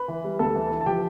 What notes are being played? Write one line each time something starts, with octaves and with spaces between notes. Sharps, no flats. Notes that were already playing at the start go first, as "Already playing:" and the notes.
Already playing: B4 B5
E3
G3
D2 A4 A5
E3
E3
A5
F3 G4 G5